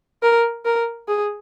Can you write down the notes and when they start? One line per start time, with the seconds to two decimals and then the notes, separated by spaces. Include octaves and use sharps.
0.22 A#4
0.65 A#4
1.08 G#4